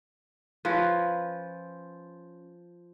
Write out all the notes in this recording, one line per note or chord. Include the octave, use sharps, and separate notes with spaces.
F3 C#4 B4